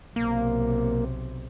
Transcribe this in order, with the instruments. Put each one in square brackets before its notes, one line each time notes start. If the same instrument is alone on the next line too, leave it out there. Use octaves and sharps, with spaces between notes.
[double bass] B1 C3 [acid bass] A#3